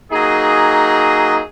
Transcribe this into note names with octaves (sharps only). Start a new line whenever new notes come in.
F#3 A#3 D#4 G#4